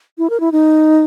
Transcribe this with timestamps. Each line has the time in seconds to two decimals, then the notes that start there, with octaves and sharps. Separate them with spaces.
0.18 E4
0.30 A#4
0.40 E4
0.52 D#4